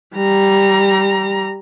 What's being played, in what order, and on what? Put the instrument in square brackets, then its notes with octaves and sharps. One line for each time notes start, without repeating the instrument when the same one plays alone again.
[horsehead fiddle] G3 A#5